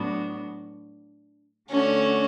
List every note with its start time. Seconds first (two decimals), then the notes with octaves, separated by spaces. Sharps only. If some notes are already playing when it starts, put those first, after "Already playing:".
Already playing: A2 F#3 B3 D4 F#4
1.70 D3 A3 C#4 D4 F#4